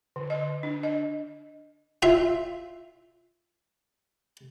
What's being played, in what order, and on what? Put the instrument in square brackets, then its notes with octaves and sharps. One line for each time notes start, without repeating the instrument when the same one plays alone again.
[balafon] D3
D#5
D4
D#5
[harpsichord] F4 E5